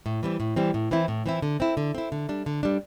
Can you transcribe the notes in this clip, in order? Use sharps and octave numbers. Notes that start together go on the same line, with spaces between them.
A2
E3 G3 C4
A2
E3 G3 C4
A2
E3 C4 E4
A2
E3 C4 E4
D3
C4 E4
D3
C4 E4
D3
G3 D4
D3
G3 D4